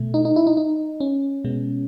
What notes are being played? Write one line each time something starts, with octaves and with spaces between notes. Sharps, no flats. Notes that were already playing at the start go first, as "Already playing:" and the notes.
Already playing: B2 A3
D#4
D#4
E4
D#4
D#4
C#4
B2 G#3 B3